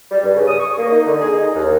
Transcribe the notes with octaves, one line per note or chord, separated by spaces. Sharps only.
G3
G2
C#3
D#6
C#6
A#3
D#4
D3
G#4
D#4
D#2